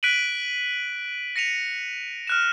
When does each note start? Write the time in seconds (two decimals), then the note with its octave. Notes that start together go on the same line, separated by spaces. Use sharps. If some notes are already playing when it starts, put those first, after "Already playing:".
0.03 F#6 B6 D7 D#7 F#7
1.36 A#6 C#7 D#7 F7
2.27 F6 F#6 E7